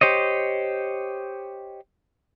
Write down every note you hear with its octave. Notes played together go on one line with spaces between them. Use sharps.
G4 C5 C#5 D#5